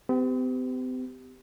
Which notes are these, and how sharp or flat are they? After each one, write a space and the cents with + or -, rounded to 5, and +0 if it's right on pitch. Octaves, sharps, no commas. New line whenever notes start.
C4 -45 G4 +0